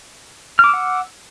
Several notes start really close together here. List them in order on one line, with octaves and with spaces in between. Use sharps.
F6 D6 E6 F#5